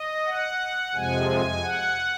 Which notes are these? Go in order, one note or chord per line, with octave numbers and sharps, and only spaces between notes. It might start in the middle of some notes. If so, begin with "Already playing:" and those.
Already playing: D#5
F#5
F2 C3 F3 G#3 G#5
F#5